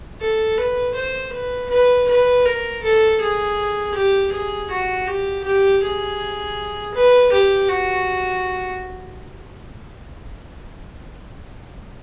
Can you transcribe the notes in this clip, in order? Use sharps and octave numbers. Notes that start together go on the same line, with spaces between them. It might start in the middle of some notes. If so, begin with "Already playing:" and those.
A4
B4
C5
B4
B4
B4
A#4
A4
G#4
G4
G#4
F#4
G4
G4
G#4
B4
G4
F#4